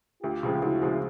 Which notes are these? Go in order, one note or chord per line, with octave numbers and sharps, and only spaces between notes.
D2 F4 G4
C#3 F3 G#3
D2 E4 F#4
C#3 F3 G#3